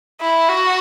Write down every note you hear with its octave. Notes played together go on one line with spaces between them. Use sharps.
E4
F#4